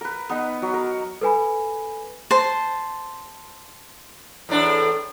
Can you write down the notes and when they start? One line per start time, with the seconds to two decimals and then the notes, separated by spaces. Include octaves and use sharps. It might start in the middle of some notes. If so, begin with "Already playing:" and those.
0.01 A#4 B4
0.29 B3 D#4 B4
0.62 F#3
0.74 A#4
1.21 A4 B4 G#5 B5
2.31 C5 A5
4.49 E2 A2 D4